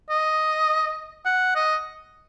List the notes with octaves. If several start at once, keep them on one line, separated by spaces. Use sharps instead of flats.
D#5
F#5
D#5